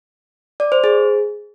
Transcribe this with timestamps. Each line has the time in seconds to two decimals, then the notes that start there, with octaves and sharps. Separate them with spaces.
0.60 D5
0.72 C5
0.84 G#4